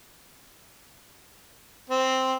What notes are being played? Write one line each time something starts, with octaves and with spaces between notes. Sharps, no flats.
C4